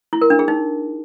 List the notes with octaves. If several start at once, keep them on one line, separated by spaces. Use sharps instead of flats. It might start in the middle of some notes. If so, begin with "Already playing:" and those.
E4
A#4
D4
G#4
D#4